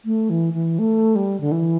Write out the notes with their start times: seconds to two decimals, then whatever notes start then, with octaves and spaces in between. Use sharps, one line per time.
0.05 A3
0.30 E3
0.54 E3
0.79 A3
1.16 G3
1.41 D3
1.52 E3